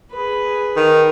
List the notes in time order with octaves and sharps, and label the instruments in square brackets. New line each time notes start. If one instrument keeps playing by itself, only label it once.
[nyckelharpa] G#4 B4
[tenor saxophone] D#3